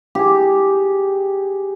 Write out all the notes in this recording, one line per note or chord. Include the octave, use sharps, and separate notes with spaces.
G4 G#4